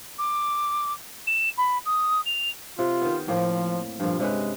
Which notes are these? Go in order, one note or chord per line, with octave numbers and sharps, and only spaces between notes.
D6
E7
B5
D#6
F7
C3 F4
D#3 B3
A2 F3 A#3 C4
G2 A#2 F3
C3 G#3 C#4 B4